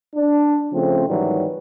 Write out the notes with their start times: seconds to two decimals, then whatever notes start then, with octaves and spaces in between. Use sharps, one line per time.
0.15 D4
0.73 C#3 F3 A3 C4
1.08 G#2 D#3 E3 F#3 G3